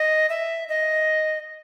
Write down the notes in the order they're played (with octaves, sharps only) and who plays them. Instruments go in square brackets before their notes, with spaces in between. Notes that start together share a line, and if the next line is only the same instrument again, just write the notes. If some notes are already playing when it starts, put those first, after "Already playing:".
Already playing: [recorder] D#5
E5
D#5